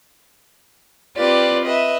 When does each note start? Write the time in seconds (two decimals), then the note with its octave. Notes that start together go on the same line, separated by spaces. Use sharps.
1.17 C4 F4 G4 B4 D5
1.64 B4 D#5 E5